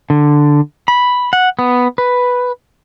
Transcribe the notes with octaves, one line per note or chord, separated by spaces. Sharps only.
D3
B5
F#5
B3
B4